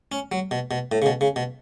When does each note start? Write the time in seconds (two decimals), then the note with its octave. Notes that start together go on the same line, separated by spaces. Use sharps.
0.12 C#4
0.32 F#3
0.51 B2
0.71 B2
0.92 A2
1.02 C#3
1.06 B2
1.21 C#3
1.36 B2